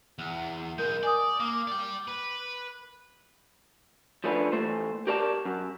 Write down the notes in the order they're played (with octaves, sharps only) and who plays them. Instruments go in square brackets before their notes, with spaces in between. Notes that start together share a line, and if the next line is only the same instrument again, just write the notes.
[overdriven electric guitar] E2
[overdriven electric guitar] B1 G#3 [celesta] A#4 G6
[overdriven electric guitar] D5 [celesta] G#5 D#6
[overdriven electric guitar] A#3 [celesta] D6
[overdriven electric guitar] D5 G5
B4
[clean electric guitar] F3 A3 C#4 D4 B4 C#5
E3 A3 C5
G4 A#4 C#5 D5 A5
F#2